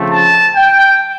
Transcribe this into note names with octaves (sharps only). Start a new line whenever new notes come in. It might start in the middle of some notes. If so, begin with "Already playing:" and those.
Already playing: C#3 F3 A3 C4
A5
G5